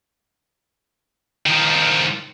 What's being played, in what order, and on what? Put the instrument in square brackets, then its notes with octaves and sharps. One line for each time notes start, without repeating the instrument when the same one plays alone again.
[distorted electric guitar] D#3 F3